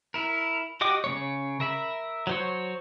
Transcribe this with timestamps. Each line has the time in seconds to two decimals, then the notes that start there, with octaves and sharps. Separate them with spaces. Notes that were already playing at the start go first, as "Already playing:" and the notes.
0.14 E4 A#4
0.81 F#4 G4 D#5 G5 D6
1.04 C#3 A#3 C#5
1.60 A#4 E5 B5
2.27 F#3 C5 C#5